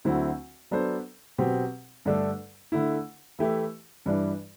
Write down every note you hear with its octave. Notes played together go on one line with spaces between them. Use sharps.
D2 D3 F#3 C4 E4
F#3 B3 D4 A4 C5
B2 F#3 C4 G4
G2 D3 A3 D4 A4
D3 A3 E4
E3 A3 E4 G4
G2 E3 G3 D4